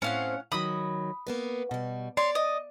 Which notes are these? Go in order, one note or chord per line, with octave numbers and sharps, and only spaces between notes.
A2 C4 C#4 C5 F5 F#5
D#3 F#3 B5 D#6
A#3 B3 B4
B2 G3
C#5 D5 C6
D#5